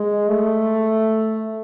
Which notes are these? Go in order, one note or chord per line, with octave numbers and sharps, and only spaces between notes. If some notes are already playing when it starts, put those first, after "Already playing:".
Already playing: G#3
A3